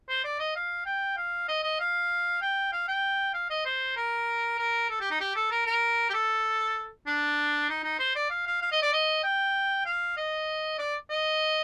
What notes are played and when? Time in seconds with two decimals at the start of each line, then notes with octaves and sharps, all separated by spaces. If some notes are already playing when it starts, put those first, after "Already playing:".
0.09 C5
0.24 D5
0.39 D#5
0.56 F5
0.86 G5
1.17 F5
1.49 D#5
1.64 D#5
1.80 F5
2.42 G5
2.73 F5
2.88 G5
3.34 F5
3.50 D#5
3.66 C5
3.97 A#4
4.59 A#4
4.90 A4
5.01 G4
5.11 D#4
5.21 G4
5.36 A4
5.51 A#4
5.67 A#4
6.10 G4
6.14 A4
7.07 D4
7.70 D#4
7.84 D#4
8.00 C5
8.16 D5
8.31 F5
8.47 F5
8.62 F5
8.72 D#5
8.82 D5
8.93 D#5
9.24 G5
9.86 F5
10.17 D#5
10.79 D5
11.10 D#5